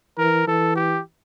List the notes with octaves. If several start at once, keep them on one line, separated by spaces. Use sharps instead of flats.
E3 A#4
E3 A4
G4